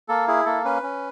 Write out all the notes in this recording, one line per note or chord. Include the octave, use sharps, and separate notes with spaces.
A#3 A4
E4 G#4
A#3 A4
C#4 B4
C#4